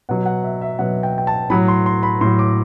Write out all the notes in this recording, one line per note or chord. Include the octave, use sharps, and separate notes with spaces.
B2 F#3 F#5
F#5
E5
E5
B2 F#3 F#5
G5
G5
A5
A2 F#3 B5
C6
C6
B5
A2 F#3 C6
D6